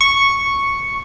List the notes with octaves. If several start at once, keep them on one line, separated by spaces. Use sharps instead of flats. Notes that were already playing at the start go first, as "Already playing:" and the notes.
C#6